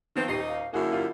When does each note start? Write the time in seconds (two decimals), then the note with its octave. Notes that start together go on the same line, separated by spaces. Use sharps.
0.16 D#3 F3 B3 C4 F4
0.28 D#1 D#4 G4 C7
0.48 F5
0.73 F#2 D3 A#3 E4 F#4 G#4
0.93 F4 G4